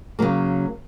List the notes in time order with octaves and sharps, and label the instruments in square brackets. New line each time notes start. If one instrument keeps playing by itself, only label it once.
[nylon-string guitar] C#3 F#3 A#3